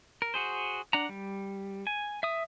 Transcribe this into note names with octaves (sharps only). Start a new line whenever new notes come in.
A#4
F#4 G#4 C5
D4 F#5 A#5
G3
G#5
E5 D#6